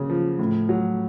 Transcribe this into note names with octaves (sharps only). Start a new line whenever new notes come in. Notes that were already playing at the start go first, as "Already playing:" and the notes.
Already playing: C#3 F#3 A#3
F3
A2
F#3